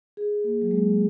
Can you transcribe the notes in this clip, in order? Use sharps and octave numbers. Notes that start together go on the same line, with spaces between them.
G#4
A#3
F#3
G#3